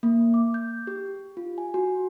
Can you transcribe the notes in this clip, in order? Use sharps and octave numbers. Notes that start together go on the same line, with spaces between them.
A#3
D6
G6
G4
F4
G#5
F#4